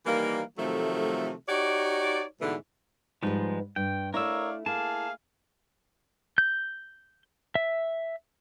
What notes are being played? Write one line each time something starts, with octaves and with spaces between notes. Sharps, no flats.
D#3 E3 G3 A#3
C3 D#3 F3 F#3 A3
D#4 F#4 G4 C#5 D5
G#2 B2 D3 E3 A3 B3
G#2 F3 G3 G#3 D#4 B4
G2 G5
A3 E4 A#4 C#5 D5 F5 E6
A#3 E4 G#4 F5 A5
G6
E5